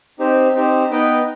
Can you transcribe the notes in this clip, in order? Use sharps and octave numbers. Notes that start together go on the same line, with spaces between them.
C4 D#4 G4 C5
C4 D#4 G4 C5
B3 D#4 B4 D#5 G5